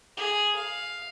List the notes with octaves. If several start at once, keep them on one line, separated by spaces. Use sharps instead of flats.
G#4
F5